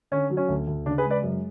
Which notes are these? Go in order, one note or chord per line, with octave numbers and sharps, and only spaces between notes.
D3 C#4
F#3
C#4
D2
D2
C#3 D4
G#4 B4
G#3
B4 D5
F#2